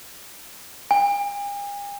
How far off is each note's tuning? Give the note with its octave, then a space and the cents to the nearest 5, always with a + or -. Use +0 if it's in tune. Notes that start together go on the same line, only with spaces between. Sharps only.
G#5 -45